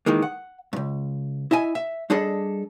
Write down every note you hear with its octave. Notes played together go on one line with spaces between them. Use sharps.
D#3 E3 G#3 A#3
F#5
C#2 G2
E4 D#5 E5 G#5
E5
G3 D4 G#4 A4 D5 D#5